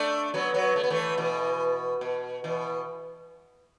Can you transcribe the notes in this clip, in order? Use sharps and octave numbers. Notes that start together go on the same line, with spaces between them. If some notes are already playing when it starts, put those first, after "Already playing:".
Already playing: A3 D4
F#3 B3
F#3 B3
A3
B3
E3 A3
B2 E3
B2
B2 E3